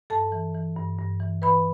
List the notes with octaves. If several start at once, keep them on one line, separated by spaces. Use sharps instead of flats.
G2 A4 A5
E3
E3
G2
G2
E3
E3 B4 B5